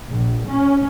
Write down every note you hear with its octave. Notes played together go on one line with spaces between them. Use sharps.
A#1
C#4